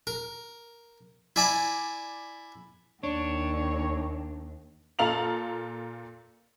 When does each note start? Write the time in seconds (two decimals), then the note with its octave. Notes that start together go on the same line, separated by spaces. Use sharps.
0.07 A#4
1.36 E4 D5 G#5 A#5 B5
3.03 D#2 D4 C#5
4.99 A#2 A4 F5 A#5 F7 F#7